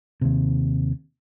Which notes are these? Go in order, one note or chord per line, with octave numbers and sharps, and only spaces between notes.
D#2 C3